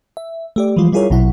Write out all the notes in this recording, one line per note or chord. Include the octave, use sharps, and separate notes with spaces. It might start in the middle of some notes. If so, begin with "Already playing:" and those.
E5
A3 G4 D5
E3 F3 G3 G#3 F4
G3 E4 F4 G#4 A#4 C#5
A#1 B2 F#3 E4 F#5